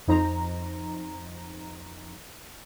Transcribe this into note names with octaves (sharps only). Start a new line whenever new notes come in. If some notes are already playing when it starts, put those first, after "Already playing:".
F2 D#4 C5 A#5